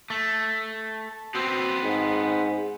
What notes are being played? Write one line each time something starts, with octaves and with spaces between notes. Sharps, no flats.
A3
B3 C4 F#4
G#2